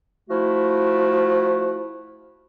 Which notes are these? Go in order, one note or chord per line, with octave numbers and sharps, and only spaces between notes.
F3 A3 E4 F#4